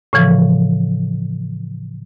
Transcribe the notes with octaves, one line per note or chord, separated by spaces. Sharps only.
A2 C#3 E3 F3